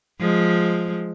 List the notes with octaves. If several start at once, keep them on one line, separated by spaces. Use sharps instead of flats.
F3 G#3